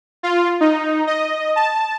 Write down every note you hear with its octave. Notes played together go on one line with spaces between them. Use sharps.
F4
D#4
D#5
A5